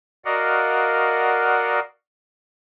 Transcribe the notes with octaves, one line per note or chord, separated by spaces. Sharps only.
F#4 A#4 D5 D#5 F5 F#5